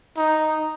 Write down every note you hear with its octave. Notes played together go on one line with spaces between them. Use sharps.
D#4